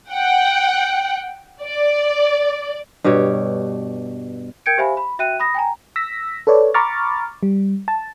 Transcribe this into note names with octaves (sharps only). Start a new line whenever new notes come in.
F#5 G5
D5
G2 B2 G4 C#5
A#4 G5 G6 G#6 C#7 D7
G4 C5 E5 F5 G#5 B5
B5
F#4 E5 G5 F#6 D#7
B5 D#6 A#6
G5 G#5 A#5
E6 A#6 B6
A4 B4 C#5 D5
A#5 B5 C#6 D6 F6 A6
G3
A5